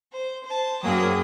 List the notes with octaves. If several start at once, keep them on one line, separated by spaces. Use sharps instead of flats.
C5
C5 A5
F#2 F#3 A#3 G#4 G5 D#6